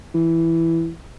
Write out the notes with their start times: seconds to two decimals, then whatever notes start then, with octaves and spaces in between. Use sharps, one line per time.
0.14 E3